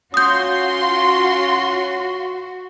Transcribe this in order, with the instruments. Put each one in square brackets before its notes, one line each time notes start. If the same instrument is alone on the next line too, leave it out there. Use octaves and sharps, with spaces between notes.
[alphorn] C#4 [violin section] F4 C6 [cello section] F#4 [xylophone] D#6 G6